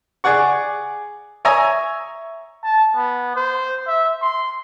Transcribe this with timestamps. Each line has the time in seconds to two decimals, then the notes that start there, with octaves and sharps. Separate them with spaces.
0.24 G#4 D5 F#5 C#6
1.45 C#5 E5 G#5 A#5 D#6
2.64 A5
2.96 B3
3.36 C5
3.87 E5
4.22 C6